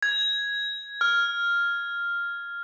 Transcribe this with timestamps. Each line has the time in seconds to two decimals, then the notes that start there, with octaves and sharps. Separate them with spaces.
0.03 G#6
1.01 F6